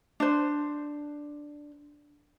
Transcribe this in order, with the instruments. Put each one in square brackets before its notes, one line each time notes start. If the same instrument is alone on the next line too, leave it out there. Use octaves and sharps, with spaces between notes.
[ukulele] D4 C5